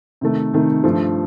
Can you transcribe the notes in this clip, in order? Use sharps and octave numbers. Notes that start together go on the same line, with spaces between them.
C3 D#3 A3
C3 D#3 A3
G2 F3 A3